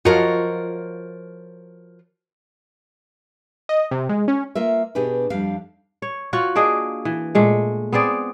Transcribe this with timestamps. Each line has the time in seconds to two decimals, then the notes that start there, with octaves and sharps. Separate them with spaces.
0.05 F#2 F3 F4 F#4 A#4 C#5 D#5
3.69 D#5
3.91 C3
4.09 G#3
4.28 C#4
4.55 A#3 F4 A#4 E5
4.95 B2 D4 G4 G#4 B4
5.30 F2 G3 D4 F5
6.02 C#5
6.33 F4 F#4 C#5 F#5
6.55 A#3 D4 G#4 D#5
7.05 E3
7.35 A#2 G#3 A3
7.92 B3 C4 G#4 D5